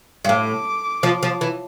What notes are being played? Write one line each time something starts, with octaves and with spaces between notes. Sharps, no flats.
G2
A2 D6
F3
F3
E3